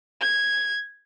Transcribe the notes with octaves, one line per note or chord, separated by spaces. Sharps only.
G#6